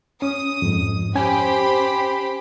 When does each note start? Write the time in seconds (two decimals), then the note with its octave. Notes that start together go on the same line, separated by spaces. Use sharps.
0.22 C#4 D#6
0.62 F2 G#2
1.15 C#4 G4 C5 G#5 B5